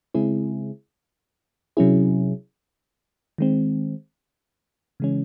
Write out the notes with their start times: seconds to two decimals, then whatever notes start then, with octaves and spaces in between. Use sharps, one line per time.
0.14 C#3 G#3 C4 E4 G#4
1.77 C3 F#3 C#4 E4 G#4
3.38 D#3 G#3 C4
5.00 C#3 E3 G#3 C#4